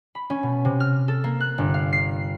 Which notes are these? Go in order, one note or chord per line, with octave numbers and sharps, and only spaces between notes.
B5
C#4
B2
C3
F6
A4
A#3
F#6
G1
F5
C7